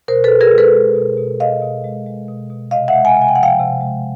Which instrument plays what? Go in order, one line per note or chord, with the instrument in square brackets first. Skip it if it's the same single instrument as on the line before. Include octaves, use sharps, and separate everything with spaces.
[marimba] B2 A#4 C5
A4 B4
B2
G#4 A#4
G#3
A4 B4
G#3
B2
B2
B2 D#5 F5
B2
G#3
G#3
B2
B2
C3 D#5 F5
E5 F#5
G#3
F#5 G#5
C3
G#5
G5
F3 F#5
F5 G5
C3
G#3